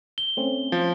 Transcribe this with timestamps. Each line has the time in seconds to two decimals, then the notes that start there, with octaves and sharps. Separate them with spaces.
0.18 G7
0.37 A3 C4 C#4
0.72 F3